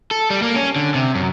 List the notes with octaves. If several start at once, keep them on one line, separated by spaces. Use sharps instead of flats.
A4
G3
A#3
C#4
D3
C3
F#2